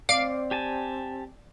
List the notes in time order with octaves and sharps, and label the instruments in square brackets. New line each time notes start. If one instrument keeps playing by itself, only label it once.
[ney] C4 [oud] D5 [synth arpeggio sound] F5
[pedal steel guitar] G4 G#5 A5